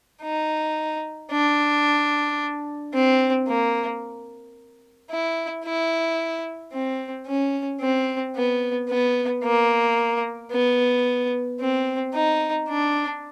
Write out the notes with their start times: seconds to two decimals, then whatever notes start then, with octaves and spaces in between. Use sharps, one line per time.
0.22 D#4
1.31 D4
2.94 C4
3.48 A#3
5.10 E4
5.65 E4
6.72 C4
7.27 C#4
7.81 C4
8.36 B3
8.89 B3
9.43 A#3
10.52 B3
11.60 C4
12.14 D#4
12.69 D4